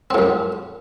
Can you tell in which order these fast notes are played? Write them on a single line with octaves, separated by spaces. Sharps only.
C4 A2 F#2